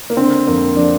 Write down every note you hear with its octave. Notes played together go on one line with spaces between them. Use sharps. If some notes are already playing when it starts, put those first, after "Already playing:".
A#3
D3 C4
F2 A#3
F3 D4